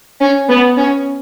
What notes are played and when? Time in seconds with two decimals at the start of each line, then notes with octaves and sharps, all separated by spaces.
0.20 C#4
0.49 B3
0.77 C#4